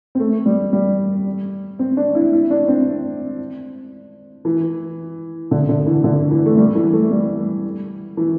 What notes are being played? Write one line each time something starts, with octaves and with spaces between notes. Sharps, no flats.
C4
A3
G3
G3
C4
D4
E4
E4
D4
C4
E3
D3
D3
E3
D3
E3
A3
G3
E3
A3
G3
E3